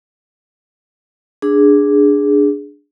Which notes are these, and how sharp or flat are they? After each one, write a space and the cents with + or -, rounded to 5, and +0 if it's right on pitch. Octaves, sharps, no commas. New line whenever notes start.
D4 +0 G#4 -5